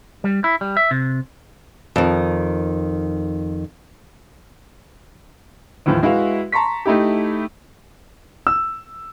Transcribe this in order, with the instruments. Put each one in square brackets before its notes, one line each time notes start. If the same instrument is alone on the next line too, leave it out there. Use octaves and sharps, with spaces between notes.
[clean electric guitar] G3
E4
G3
E5
C3
[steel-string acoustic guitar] F2 D#3
[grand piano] D#2 A2 E3 F3
G#3 E4 F#4 B4 E5 F5
A5 A#5 C6 C#6 B6
A3 D#4 E4 G4
E6